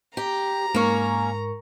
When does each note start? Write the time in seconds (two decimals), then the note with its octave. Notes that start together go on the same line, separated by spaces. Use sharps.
0.17 G4 A#5
0.74 G#2 A#3 C#4 A#4 C#6